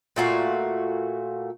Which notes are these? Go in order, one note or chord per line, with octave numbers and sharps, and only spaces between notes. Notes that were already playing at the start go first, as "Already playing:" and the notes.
A#2 A3 F#4 F5